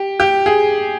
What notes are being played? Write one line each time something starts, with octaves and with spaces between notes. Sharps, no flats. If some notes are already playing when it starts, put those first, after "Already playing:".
Already playing: G4
G4
G#4